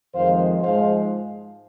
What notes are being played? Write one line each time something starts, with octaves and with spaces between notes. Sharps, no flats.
F2 D#3 G#3 C5 F5
G#2 F3 G#3 C5 F5